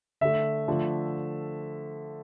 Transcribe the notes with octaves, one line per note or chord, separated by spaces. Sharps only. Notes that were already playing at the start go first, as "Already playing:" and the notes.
D3 A3 E5
D3 F3 A3